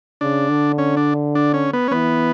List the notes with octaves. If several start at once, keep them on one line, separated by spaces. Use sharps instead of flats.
C#3 D4
D3
C#4
D4
D4
C#4
B3
C#4
E3 B3